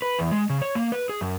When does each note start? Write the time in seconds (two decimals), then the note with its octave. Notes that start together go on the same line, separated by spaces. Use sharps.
0.02 B4
0.19 E2
0.31 G#3
0.50 C#3
0.61 C#5
0.75 A#3
0.92 B4
1.09 G#4
1.21 F#2